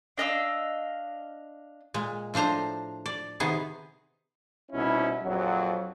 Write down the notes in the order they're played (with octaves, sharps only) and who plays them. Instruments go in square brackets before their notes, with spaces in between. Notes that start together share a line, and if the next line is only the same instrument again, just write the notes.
[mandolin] D4 D#5 F5 E6
[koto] A#2 G#3
A2 F3 D4 C5 A#5
D5
C3 D#3 B3 G#4
[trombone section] C2 B2 C#4 D#4 E4
A#1 F2 F#3